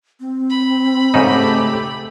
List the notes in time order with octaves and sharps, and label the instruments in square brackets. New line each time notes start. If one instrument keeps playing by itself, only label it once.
[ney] C4
[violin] B5
[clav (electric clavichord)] G#2 C#3 D#4 [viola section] A3 G4